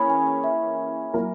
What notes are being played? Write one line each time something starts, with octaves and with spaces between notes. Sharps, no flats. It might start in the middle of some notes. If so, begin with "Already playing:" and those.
Already playing: E3 A#3 C#4 G#4 B5
G#5
G#5
E5
F#3 A#3 E4 A#4